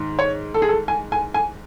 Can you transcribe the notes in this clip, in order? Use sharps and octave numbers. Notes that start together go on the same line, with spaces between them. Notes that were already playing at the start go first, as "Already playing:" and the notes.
Already playing: G#2 D#3
C#5
A4
G#4
A4
G#5
G#5
G#5